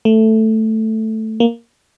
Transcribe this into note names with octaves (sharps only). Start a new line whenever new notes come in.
A3
A#3